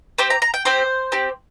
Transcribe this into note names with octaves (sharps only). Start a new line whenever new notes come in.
C4 G4 C5
A#5
A#5
G5
C4 G4 C5
C4 G4